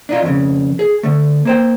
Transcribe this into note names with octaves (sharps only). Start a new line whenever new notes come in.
D4 D#4 F4
F2 C#3
G#4
D3 A3
A#3 C5 G5